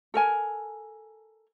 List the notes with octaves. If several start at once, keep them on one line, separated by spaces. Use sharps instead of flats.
A4 A#4 G#5